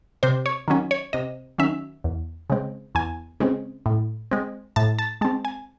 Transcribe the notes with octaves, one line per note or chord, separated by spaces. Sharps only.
C3 C5
C#5
D#3 F#3 C#4
C#5
C3 D#5
D#3 F#3 C#4 E5
E2
C#3 G#3 C4
E2 G#5
C#3 G#3 C4
A2
G#3 C4
A2 A5
A5
G#3 C4 A5
G#5